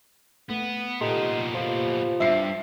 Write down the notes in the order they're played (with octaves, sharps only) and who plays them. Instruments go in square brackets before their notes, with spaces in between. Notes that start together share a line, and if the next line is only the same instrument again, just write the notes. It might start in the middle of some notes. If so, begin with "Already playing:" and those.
[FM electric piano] A3 [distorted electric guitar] B3
[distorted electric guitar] A#2 B3 [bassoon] D#4 [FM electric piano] G4 A4 C6
[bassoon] F3
[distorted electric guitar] G2 [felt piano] E5 C7